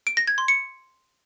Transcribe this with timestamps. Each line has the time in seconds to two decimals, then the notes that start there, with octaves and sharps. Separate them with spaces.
0.07 D7
0.17 A#6
0.27 G#6
0.38 C6
0.48 C#7